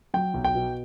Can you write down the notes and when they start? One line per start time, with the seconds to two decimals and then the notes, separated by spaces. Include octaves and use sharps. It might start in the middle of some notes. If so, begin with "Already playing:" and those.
0.14 F#3 G5
0.34 B1
0.44 G5
0.55 B2